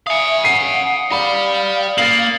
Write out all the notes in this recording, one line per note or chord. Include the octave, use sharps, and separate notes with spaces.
E5 F5 G#5 D#6 C#7
F#5 C7 D#7
G4 D5 F5 B5
A#3 A6 C7 F#7